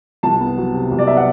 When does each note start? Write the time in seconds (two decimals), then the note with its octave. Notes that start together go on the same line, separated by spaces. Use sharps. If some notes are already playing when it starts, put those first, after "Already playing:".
0.23 C2 A5
0.41 B3
0.58 F#3
0.74 C3
0.92 C2
0.99 D5
1.07 B3 E5
1.17 F#5